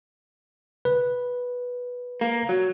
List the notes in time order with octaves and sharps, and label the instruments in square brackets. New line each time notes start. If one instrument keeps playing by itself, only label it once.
[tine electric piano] B4
[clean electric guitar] A#3
F#3